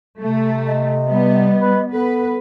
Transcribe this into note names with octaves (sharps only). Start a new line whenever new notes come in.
C3 A3
D#5
G3 B3
B4
B3 A4 B4